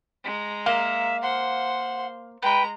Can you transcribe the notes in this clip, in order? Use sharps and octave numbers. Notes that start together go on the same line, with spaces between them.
G#3 A#5
A#3 E5 F5
C5 F#5 C6
G#3 B4 G5 A#5 B5